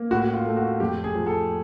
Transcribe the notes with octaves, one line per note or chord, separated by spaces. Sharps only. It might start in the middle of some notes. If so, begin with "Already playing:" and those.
Already playing: A#3
A2 F#4
F4
A3
F#4
F2 G4
G#4
F3
A4